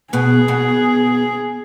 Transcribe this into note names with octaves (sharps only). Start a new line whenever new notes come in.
B2 B3 G#4
B2 B3